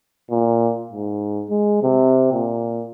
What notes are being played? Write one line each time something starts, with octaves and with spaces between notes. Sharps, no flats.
A#2
G#2
G#3
C3
A#2